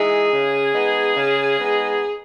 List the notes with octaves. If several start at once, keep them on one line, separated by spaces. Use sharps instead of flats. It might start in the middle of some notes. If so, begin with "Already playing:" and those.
Already playing: E3 G#3 D#4 G#4
C#3
G#3 B3 D#4
C#3
G#3 B3 D#4